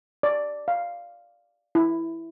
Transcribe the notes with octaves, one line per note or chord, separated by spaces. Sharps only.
D5
F5
E4